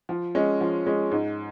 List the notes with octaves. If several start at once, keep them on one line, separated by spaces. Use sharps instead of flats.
F3
G#3 C#4
F3
G#3 C#4
G#2